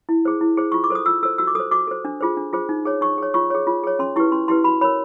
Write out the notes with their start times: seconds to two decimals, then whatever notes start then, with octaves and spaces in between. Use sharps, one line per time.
0.09 E4
0.25 G#4 C5
0.41 E4
0.57 G#4 C5
0.72 F4 C#6
0.84 D6
0.90 A4 C5 D#6
1.06 F4 E6
1.23 A4 C5 E6
1.38 F#4 E6
1.47 D6
1.55 A4 D#6
1.60 C5
1.71 F#4 D6
1.87 A4 C5
2.05 D4
2.20 F4 G#4 C5
2.37 D4
2.53 F4 G#4 C5
2.69 D#4
2.85 G#4 C#5
3.01 D#4 C#6
3.18 G#4 C#5
3.34 F4 C#6
3.50 G#4 C#5
3.67 F4
3.84 G#4 C#5
3.99 C#4 C6
4.16 E4 G4 B4 C#6
4.32 C#4 C6
4.48 E4 G4 B4 C6
4.64 F#4 B5
4.81 A#4 C#5 B5